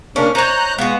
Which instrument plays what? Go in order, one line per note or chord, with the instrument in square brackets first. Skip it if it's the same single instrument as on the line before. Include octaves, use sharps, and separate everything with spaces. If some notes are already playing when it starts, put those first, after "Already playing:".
[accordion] C#3 A#3 D4 [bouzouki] C#4 [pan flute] A#4
[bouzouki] D#4 C#5 [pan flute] C5 [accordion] A#5 F#6 G6
[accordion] G#3 [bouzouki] B3 F#4 [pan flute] F5